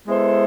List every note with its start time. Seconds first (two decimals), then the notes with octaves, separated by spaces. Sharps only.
0.06 G#3 B3 E4 A4 C5